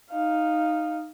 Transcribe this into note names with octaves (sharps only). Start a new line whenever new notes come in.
D#4 F5